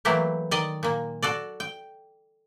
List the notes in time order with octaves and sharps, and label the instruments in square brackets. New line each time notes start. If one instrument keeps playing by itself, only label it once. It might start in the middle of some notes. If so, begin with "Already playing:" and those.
[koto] E3 F#3 A3 A#3 E4 G4
D#3 D5 D#5
A#2 A#3
F#4 A4 D5
G5